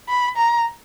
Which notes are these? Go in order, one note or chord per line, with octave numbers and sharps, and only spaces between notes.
B5
A#5